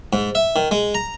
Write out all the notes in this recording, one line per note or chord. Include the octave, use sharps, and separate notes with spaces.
G#2
E5
D#3
G#3
A#5